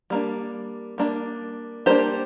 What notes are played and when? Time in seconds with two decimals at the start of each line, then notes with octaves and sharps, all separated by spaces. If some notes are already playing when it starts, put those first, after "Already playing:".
0.10 G3 A#3 D4
0.98 G3 A#3 D4
1.86 G3 A#3 D4 G4 C5